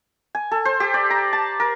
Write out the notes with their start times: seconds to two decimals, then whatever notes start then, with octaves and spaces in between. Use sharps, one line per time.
0.35 G#5
0.51 A4
0.65 C5
0.80 G4
0.94 D5
1.10 A#5
1.33 A5
1.60 A#4